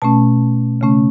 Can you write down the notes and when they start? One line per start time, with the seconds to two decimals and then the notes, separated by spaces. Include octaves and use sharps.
0.02 B2 A3 C#4 A5
0.81 C#3 A3 C#4